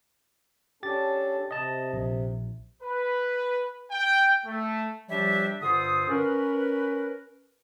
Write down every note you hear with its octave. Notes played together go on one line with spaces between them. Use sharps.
C#4 D4 G4 A4 A6
C3 D#5 A5
A#1
B4
G5
A3
F3 G3 D4 G4 C#5 E5
G2 D3 F4 C5 D#6
C#4 A#4 B4